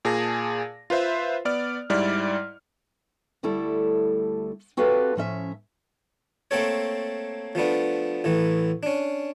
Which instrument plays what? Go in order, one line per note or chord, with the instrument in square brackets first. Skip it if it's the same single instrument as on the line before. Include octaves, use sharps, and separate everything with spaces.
[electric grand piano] A#2 G#4 A5 A#6
F4 B4 C5 E5
B3 D5 F6
G#2 G3 E4 D5 F6
[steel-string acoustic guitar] D2 G3 A3 E4 A4
C4 F#4 G4 A4 B4 F5
A2 F3 C#4 E5
[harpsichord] A3 A#3 C4 A4 C#5
F3 A3 B3 D4
A1 E3 A3
C#4 D4